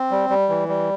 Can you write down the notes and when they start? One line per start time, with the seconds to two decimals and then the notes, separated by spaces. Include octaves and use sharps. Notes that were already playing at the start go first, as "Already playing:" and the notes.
Already playing: C4
0.11 G3
0.30 G3
0.49 E3
0.68 G3